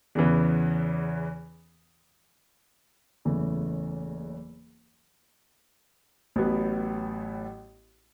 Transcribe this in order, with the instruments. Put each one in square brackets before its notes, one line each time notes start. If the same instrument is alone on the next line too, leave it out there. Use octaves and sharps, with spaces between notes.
[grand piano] E2 C#3 E3 B3
F#1 E2 C#3 E3 A3
A1 A2 F#3 B3